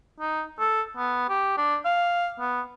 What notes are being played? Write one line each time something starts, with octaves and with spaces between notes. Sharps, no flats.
D#4
A4
B3
G4
D4
F5
B3